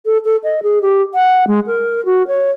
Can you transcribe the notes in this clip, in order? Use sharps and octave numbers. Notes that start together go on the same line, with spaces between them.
A4
A4
D#5
G#4
G4
F#5
G#3
A#4
F#4
C#5